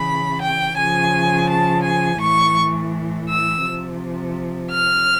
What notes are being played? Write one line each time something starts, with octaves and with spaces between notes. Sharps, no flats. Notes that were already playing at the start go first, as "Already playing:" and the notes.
Already playing: C#3 E3 B5
G5
C#3 F3 G#5
A5
G#5
A2 E3 C#6
E6
C3 F3
F6